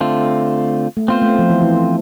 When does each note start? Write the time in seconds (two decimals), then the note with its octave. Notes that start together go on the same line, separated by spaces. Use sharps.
0.01 D3 A3 C4 F4
0.97 A3
1.08 B3 C4 F4 C5
1.22 A3
1.39 F3
1.50 E3
1.62 E3